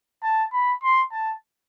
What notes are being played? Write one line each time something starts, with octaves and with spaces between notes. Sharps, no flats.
A5
B5
C6
A5